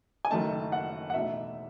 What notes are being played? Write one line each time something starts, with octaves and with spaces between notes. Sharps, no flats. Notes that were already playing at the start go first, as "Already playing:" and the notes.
G#5
F#1 F#2 D#3 A3 D#4 A5
F#5
F#5
E2 B2 A3 D#4 E5